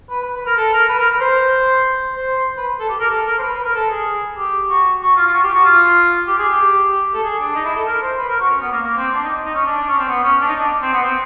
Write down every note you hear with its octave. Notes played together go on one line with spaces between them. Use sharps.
B4
B4
B4
A#4
A4
A#4
B4
A#4
B4
C5
C5
B4
A4
G4
A#4
A4
A#4
C5
B4
B4
A#4
A4
G#4
G4
F#4
F#4
F4
F4
F#4
G4
F#4
F4
G4
G#4
G4
G4
A4
G#4
D4
D#4
E4
A4
A#4
C5
B4
A#4
F#4
C#4
B3
A#3
A#3
C4
D4
D#4
D#4
C#4
D4
D4
C#4
C4
B3
C#4
D4
D#4
D4
C4
B3
C4